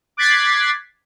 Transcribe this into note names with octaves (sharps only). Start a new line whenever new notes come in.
D6 F#6 G#6 A6 B6 C7